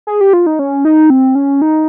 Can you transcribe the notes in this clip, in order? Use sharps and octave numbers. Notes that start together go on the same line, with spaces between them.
G#4
G4
F4
D#4
C#4
D#4
C4
C#4
D#4